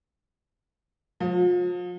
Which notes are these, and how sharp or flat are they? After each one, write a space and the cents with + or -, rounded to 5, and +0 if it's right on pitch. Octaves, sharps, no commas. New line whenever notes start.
F3 +35